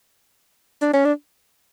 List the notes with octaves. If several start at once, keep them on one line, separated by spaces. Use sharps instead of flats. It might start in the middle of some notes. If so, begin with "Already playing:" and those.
D4
C#4
D4